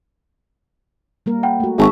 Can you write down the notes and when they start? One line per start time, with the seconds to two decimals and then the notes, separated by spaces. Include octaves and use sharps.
1.26 G3 A#3 A#4
1.43 F#5 G5 B5
1.60 A3 F#4
1.78 G#1 G#4 E5 A5 C#6